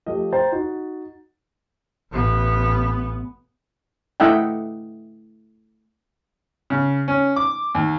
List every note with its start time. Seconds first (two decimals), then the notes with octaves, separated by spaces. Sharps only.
0.06 F3 A3 G4 D#5
0.33 C5 G5 A#5 A6
0.52 D#4 F#4
2.13 A1 B3
4.20 A3 E4 D#5 E5 F#5 G5
6.70 C#3
7.08 C#4
7.36 D6
7.75 D#2